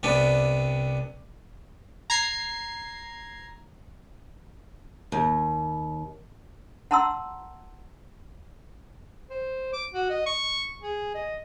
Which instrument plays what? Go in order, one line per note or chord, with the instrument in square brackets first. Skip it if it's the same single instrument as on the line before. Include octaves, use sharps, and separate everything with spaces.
[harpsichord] C2 C3 B3 D4
[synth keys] A#5 G#6 C7
[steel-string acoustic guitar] D#2
[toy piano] F#5 A5 A#5 C6 E6
[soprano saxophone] C5
D6
F#4
D#5
C#6
G#4
D#5